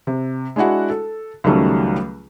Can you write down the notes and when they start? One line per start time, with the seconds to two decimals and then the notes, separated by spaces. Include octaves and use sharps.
0.07 C3
0.56 G#3 D4 E4 F#4 F#5
0.90 A4
1.44 C#2 D#3 F#3 G3 A3